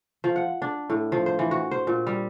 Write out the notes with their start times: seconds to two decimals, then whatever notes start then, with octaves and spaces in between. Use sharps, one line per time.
0.24 F3
0.36 F#5
0.62 D4
0.90 A2
1.12 F3
1.26 C5
1.39 E3
1.51 F#4
1.71 C5
1.87 A#2
2.07 G3